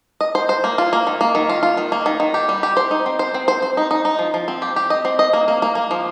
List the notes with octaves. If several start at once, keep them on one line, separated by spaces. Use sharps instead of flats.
D#5
C5
C5
A#3
F4
A#3
D#3
A#3
D#3
F4
F4
D#3
A#3
D#3
D#3
G4
G3
G4
C5
D#4
C4
C5
C4
C5
C5
D#4
D#4
D#4
F3
F3
C4
G4
G4
D#5
C4
D#5
A#3
A#3
A#3
A#3
F3